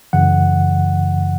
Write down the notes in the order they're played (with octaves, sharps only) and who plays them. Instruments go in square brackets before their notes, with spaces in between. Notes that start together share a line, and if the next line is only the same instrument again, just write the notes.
[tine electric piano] F#2 C#3 E3 F#5